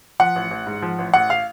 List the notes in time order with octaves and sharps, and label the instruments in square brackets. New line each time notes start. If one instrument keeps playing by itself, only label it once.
[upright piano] F3 F#5
A1
A1
G#2
F3
A1
A1 F#5
F5